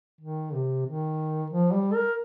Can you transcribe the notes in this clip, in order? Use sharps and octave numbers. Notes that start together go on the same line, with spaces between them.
D#3
C3
D#3
F3
G3
A#4